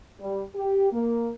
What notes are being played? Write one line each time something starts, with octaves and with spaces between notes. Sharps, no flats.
G3
G4
A#3